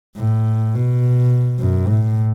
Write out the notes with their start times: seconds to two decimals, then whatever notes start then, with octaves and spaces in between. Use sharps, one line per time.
0.17 A2
0.74 B2
1.59 F#2
1.88 A2